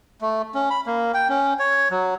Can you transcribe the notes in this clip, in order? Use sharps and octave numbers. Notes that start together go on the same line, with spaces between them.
A3
C#4
B5
A#3
G5
C#4
C#5
F#3